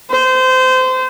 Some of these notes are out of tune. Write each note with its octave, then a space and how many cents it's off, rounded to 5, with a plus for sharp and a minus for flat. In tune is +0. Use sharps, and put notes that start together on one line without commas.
C5 -25